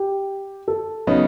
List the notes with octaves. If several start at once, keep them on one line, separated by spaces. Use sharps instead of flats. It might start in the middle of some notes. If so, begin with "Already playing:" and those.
Already playing: G4
A4
C#3 F#3 B3 D#4